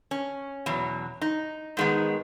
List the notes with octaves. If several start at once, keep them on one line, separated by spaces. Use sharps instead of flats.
C#4
E2 B2 F#3
D#4
G#2 D#3 G#3 B3